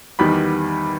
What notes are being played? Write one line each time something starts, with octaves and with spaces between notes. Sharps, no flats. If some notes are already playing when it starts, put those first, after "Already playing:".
E2 D#3 G3 B3 B5